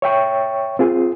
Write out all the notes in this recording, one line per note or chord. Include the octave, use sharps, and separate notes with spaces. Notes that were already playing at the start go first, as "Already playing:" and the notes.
C#5 E5 G5 C#6
C4 F4 G#4